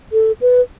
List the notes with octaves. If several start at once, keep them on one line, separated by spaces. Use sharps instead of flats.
A4
B4